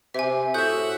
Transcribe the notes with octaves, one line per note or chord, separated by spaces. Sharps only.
C3 E5 G#5
A2 F#4 E5 F#5 D#6 G6